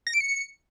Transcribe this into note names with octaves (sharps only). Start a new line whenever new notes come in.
A#6
D7
C#7